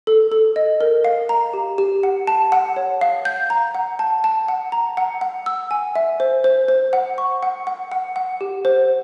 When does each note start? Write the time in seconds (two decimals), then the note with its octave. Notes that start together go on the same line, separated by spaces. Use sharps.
0.07 A4
0.32 A4
0.56 D#5
0.81 A#4
1.04 F5
1.29 A#5
1.54 G4
1.78 G4
2.03 F#5
2.27 A5
2.52 F#5
2.76 C#5
3.01 F5
3.25 G6
3.50 A#5
3.75 F#5
3.99 A5
4.24 A5
4.48 F#5
4.72 A#5
4.97 F#5
5.21 F#5
5.46 E6
5.71 G#5
5.96 E5
6.20 C5
6.44 C5
6.68 C5
6.93 F#5
7.18 C#6
7.43 F#5
7.67 F#5
7.92 F#5
8.16 F#5
8.41 G4
8.65 C5